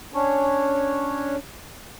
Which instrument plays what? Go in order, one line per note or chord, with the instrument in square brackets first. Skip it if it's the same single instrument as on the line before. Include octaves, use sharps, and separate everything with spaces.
[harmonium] C#4 D4 C#5